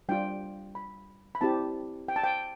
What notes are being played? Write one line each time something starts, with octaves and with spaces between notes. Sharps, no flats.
G3 D4 F4 G5
B5
B5
C4 E4 G4 A5
G5
A5
G5